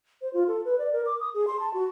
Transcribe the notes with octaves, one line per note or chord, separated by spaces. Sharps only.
C5
F4
A4
B4
D5
A#4
D6
D#6
G#4
C6
A5
F#4